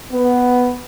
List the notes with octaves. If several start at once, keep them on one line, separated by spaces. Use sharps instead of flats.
B3